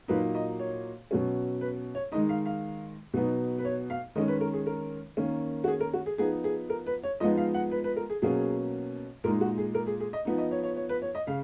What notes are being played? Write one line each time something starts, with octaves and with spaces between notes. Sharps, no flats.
A#2 F#3 A#3 D#4 B4
D#5
C#5
B2 F#3 C#4
B4
C#5
D#3 G#3 D#4 D#5
F5
F5
B2 F#3 B3 D#4
B4
C#5
F5
D#3 G#3 C#4 D#5
B4
A#4
G#4
A#4
D#3 A#3 C#4
F#4
G#4
A#4
F#4
G#4
F3 B3 D#4 G#4
G#4
A#4
B4
C#5
F3 G#3 B3 D#4 D#5
F5
F#5
B4
B4
A#4
G#4
B2 F#3 A#3 C#4 G#4
A#2 G#3 D#4 A#4
F#4
G#4
A#4
G#4
G#4
D#5
F3 B3 D#4
D#5
C#5
C#5
C#5
B4
C#5
D#5
C#3 F5